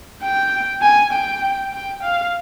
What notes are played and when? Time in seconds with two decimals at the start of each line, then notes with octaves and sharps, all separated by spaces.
0.22 G5
0.82 G#5
1.13 G5
1.73 G5
2.03 F5